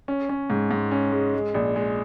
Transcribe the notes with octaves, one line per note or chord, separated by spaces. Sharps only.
C#4
C#4
G#2
G#2
C#4
G#3
G#3
A#1
G#3